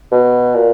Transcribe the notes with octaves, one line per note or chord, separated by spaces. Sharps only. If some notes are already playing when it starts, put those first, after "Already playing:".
B2
A#2